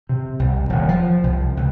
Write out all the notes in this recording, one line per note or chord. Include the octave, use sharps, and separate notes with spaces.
C3
C2
D#1
F3
C2
C#2